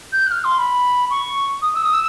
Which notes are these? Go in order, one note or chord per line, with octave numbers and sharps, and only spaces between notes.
G6
F#6
F6
C6
B5
C#6
D#6
E6
D#6
E6